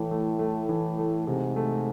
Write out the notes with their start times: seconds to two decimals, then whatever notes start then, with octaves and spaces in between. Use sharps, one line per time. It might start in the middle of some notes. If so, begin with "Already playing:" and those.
Already playing: A2 E3 A3
0.11 A3
0.39 A3
0.69 E3
0.98 A3
1.27 G#2 C3
1.56 A3